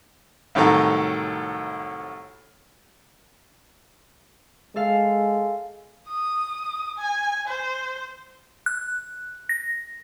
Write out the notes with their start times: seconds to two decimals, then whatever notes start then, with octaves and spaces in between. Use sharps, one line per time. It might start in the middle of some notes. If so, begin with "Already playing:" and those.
0.55 C2 A2 D#3 F#3 A4 A#5
4.76 G#3 A4 F5
6.08 D#6
6.98 G#5
7.48 C5
8.66 F#6
9.49 A#6